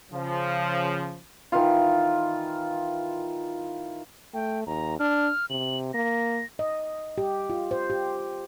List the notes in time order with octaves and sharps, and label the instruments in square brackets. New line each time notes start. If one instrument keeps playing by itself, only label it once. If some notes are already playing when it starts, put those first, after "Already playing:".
[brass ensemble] C#3 F3
[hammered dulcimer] D#3 E3 F4
[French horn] A3 [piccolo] G5
[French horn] D#2 [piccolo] A#5
[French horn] D4 [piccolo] F6
[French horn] C3 [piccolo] F#7
[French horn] A#3 [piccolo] A#6
[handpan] D#5
G4
F4
C5
G4